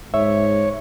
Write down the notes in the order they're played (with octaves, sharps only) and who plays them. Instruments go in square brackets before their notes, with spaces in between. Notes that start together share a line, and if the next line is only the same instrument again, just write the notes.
[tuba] G#2 [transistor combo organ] C#5 [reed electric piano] E5